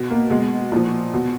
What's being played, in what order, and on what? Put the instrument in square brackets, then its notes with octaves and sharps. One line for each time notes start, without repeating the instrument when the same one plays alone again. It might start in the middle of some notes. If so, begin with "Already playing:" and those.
Already playing: [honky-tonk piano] B2
A#3
B2 G#3
A#2 F3
B2